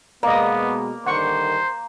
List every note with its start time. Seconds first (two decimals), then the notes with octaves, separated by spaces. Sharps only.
0.23 B2 G#3 A#3 B3 D5 D#5
1.06 G2 D3 D#3 C5 F#5 C#6